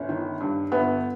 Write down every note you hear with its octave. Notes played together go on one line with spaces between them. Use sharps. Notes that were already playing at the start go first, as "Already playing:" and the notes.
Already playing: G1 C#4
D#3
G2
G1 B3